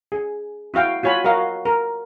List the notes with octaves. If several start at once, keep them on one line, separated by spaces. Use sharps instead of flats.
G#4
E4 F#4 F5 G5
F4 F#4 C#5 G#5 B5
F#4 A#4 D#5 F5
A#4